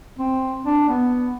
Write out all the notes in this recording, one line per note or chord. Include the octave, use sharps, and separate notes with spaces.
C4
D4
B3